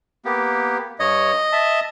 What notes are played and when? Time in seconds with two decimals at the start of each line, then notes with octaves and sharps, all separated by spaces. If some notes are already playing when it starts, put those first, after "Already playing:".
0.25 A#3 B3 G4
1.00 G2 C#5 D#5
1.53 E5 A5